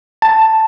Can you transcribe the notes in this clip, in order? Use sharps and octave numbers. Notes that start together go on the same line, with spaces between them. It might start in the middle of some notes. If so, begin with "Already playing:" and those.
A5